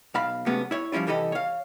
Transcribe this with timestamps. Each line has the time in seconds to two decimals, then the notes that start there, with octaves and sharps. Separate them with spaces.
0.14 B1 F5 B5
0.46 F#2 C3 G#3 A3 B3 C#4
0.71 E4 C#5
0.92 F3 G3 C#4 E4 F4
1.07 C2 E3 G4 A4 D#5 B5
1.32 C#5 F5